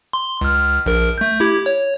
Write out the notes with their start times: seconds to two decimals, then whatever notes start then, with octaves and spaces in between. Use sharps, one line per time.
0.13 C6
0.41 C#2 F6
0.86 A#1 A#4
1.18 A3 G6
1.40 E4 G4 G#6
1.66 C#5